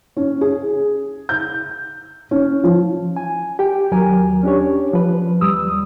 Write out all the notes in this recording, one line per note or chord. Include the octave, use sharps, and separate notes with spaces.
C#4
G#4
G6
C#4
F3
G#5
G4 G5
D#2 F#3 A#4 G#5
C#4 D4 G4 C#5
F3 B4
D#2 G3 D#6 E6